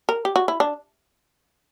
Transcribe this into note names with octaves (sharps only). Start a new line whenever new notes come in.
A#4
G4
F#4
E4
D4